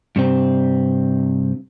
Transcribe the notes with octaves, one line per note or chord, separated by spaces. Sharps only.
G2 C3 C4